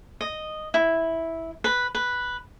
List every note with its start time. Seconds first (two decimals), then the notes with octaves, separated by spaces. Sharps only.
0.21 D#5
0.74 E4
1.64 B4
1.95 B4